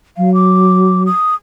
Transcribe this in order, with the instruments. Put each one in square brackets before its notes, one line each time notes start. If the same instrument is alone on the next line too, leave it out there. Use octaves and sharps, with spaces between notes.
[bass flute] F#3 [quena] F5
[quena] D6
D#6